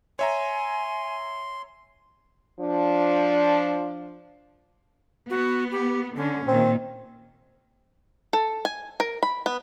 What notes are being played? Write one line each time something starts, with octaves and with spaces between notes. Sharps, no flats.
C#5 E5 G#5 A#5 C6
F3 D4
B3 F#4
G4
D3 C#4
A#2 D#3 C4
A4
G#5
A#4
B5
B3